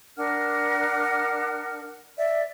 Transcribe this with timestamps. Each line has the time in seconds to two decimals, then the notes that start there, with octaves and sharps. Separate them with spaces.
0.17 D4 A#4 F#5 F6
2.18 D5 E5